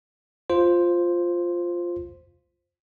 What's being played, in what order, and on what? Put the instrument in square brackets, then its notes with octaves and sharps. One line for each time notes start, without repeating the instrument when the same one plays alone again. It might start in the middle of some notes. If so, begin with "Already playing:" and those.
[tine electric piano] F4 C5